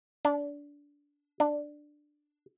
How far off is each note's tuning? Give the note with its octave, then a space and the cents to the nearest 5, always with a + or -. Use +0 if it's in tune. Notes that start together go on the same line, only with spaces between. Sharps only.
D4 -20
D4 +10